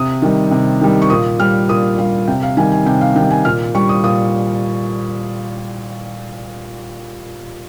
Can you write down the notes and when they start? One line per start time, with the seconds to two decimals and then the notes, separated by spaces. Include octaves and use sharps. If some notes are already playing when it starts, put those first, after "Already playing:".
Already playing: C3 D#6
0.22 D#3 G3
0.51 C3
0.81 D#3 G3
1.02 C#6
1.10 A#2 D#6
1.40 G3 F6
1.69 A#2 D#6
1.98 G3 F5
2.28 C3 G5
2.42 F5
2.57 D#3 G3 G#5
2.72 G#5
2.86 C3 G5
3.01 F5
3.16 D#3 G5
3.20 G3
3.31 G#5
3.45 A#2 F6
3.74 G3 C#6
3.89 D#6
4.04 A#2 D#6